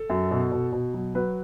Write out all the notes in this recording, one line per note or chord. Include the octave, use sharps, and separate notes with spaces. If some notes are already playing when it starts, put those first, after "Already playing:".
Already playing: A4
F#2
B2
B2
B2
F#3
F#3 B4